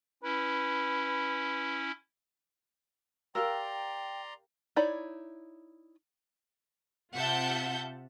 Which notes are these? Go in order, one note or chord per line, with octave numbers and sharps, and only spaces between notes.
C#4 E4 B4
G4 A#4 D5 F5 G5 A#5 C6 E6
D#4 E4 C#5 D5 B5
C3 F4 E5 F#5 A5 G6